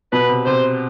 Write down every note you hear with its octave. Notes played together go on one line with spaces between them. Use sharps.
B2 B4
C3
C3 C5